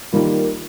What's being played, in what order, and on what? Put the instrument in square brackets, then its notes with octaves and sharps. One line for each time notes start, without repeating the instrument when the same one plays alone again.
[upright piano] D#3 G3 A#3 F4